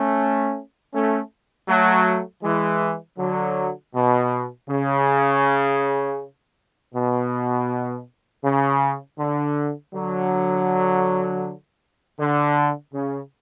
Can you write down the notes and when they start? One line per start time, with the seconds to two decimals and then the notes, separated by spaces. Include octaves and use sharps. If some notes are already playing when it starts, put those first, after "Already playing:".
Already playing: A3 C#4
0.94 A3 C#4
1.69 F#3 A3
2.44 E3 G#3
3.18 D3 F#3
3.94 B2
4.69 C#3
6.94 B2
8.43 C#3
9.19 D3
9.94 D3 F#3
12.19 D3
12.94 C#3